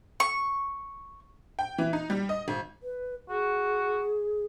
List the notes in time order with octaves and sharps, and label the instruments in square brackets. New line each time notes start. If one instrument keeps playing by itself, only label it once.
[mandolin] C#6
[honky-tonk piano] G5
E3
D#4
G3
D#5
G#1
[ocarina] B4
[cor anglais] F#4 [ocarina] G#4